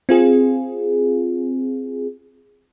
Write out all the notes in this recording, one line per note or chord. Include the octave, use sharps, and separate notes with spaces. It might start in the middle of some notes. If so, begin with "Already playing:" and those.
C4 F4 G#4